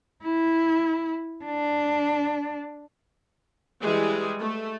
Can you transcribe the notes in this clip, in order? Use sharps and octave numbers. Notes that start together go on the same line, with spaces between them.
E4
D4
E3 G3 G#3 G#4
A3